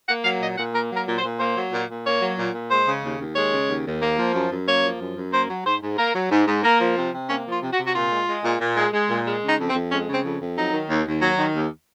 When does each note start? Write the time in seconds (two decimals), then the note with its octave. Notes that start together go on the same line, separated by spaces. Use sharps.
0.08 A#3 F#5
0.24 F#3 F5
0.41 A#2 D#5
0.57 A#2 F#5
0.74 A#3 A#4
0.91 F#3
0.96 A#4
1.07 A#2
1.18 C5
1.24 A#2
1.39 A#3 C5
1.56 F#3
1.73 A#2
1.89 A#2
2.05 A#3 C#5
2.21 F#3
2.38 A#2
2.54 A#2
2.70 G#3 C5
2.87 C#3
3.04 D#2
3.20 D#2
3.36 G#3 C#5
3.53 C#3
3.68 D#2
3.86 D#2
4.02 A#3
4.18 F3
4.34 F#2
4.51 F#2
4.67 A#3 C#5
4.83 F3
5.00 F#2
5.16 F#2
5.33 A#3 C5
5.49 F#3
5.65 G#2 C5
5.82 G#2
5.98 A#3 A#4
6.15 F#3
6.31 G#2
6.47 G#2
6.64 A#3 A#4
6.80 F3
6.97 C3
7.13 C3
7.29 A#3 C#4
7.46 F3
7.51 F4
7.62 C3
7.72 F#4
7.78 C3
7.86 F#4
7.95 A#2 F4
8.11 G#3
8.28 G#3
8.44 A#2
8.60 A#2
8.77 G#3
8.93 G#3
9.09 A#2
9.26 G#3
9.43 C#3
9.48 D#4
9.59 F2
9.70 C4
9.75 F2
9.91 G#3 C#4
10.08 C#3
10.14 C4
10.24 F2
10.40 F2
10.57 F#3 D#4
10.73 D#3
10.89 D#2
11.07 D#2
11.22 F#3
11.38 D#3
11.55 D#2